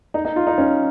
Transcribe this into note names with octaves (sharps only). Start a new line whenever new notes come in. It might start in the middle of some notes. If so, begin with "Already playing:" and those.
D#4
D#4
F4
D#4
C#4